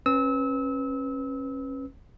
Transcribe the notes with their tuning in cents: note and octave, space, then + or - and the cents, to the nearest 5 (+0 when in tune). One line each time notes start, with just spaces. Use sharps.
C#4 -30 B4 +0 E6 -30